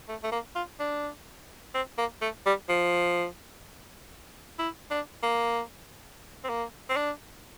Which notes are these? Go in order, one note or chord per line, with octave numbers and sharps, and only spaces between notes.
A3
A3
A#3
F4
D4
C4
A#3
A3
G3
F3
E4
D4
A#3
C4
A#3
C4
D4